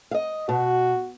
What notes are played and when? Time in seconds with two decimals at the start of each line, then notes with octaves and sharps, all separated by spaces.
0.11 D#5 F5
0.49 B2 F#4